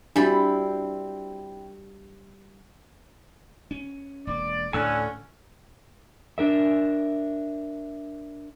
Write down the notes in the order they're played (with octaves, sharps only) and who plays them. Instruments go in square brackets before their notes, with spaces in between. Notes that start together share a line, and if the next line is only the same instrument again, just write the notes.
[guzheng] G3 B5 [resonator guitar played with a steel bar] C4 E4 [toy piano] D4 F#4
[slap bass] C#4
[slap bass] E1 A#3 [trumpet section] D5
[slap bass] D2 A2 [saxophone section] D3 [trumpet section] C#4 [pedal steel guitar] G#5 E6 F#6
[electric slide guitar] D4 A#4 E5